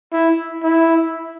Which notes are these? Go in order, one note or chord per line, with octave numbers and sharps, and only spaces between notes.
E4
E4